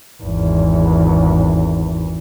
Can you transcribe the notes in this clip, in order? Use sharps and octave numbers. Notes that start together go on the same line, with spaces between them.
G#1 E2